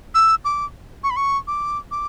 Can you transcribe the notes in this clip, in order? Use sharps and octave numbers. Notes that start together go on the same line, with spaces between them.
E6
D6
C#6
B5
C#6
D6
D6